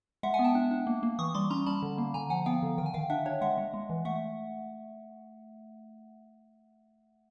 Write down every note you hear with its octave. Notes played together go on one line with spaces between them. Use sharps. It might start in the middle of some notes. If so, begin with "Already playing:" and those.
G#3 E5 F#5
F#5 G#5
B3
G5 A5
D4
D4
A#3
A#3
E3 C#6 D#6
G3 C6 D6
C#4 A#5 C6
G3 A5 B5
D3
A#3
D3 G#5 A#5
F3 F#5 G#5
B3 F5 G5
D3
D#3 G5
G#5
D#3 F5 G5
D4 E5 F#5
D4 C#5
G#3 E5 F#5
G#3
G#3
E3
A3 E5 F#5